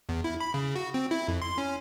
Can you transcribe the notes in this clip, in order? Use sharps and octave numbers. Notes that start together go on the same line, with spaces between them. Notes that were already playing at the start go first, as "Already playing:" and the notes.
E2
E4
B5
C#3
F#4
C4
E4
F2
C6
C#4